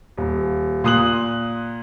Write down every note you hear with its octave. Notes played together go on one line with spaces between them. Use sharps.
D#1
A#2 C6 D#6 F#6 F#7